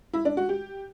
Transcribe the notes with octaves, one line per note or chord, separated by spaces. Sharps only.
E4
D4
F#4
G4